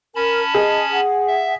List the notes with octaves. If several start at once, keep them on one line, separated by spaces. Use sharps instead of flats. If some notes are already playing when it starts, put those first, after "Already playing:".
C#4 A#4 A5 B5
G#4 D#5
F#5
E5